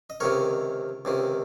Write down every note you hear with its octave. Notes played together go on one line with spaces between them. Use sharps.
D#5
C#2 C3 D#3 A#4 C#5
C#2 C3 D#3